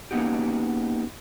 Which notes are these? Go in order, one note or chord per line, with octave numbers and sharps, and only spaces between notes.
A#3 B3 C#4 D#4 F#4 G4